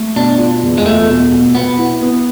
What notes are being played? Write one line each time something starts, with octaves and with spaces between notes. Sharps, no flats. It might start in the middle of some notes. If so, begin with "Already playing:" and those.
Already playing: A3
B2 D4
F4
E2
G#3
A3 F4
B2
B2
B2 B3
E4
B3